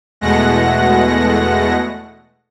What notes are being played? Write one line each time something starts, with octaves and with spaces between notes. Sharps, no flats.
E2 B2 G#3 A3 F#5 A#6